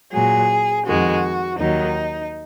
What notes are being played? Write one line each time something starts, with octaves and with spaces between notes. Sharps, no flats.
A#2 F#3 G#4
F2 D#3 G#3 F#4
D#2 D#3 F#3 D#4